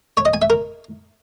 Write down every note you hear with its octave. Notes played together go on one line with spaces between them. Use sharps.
C#5
D#5
G#5
E5
A#4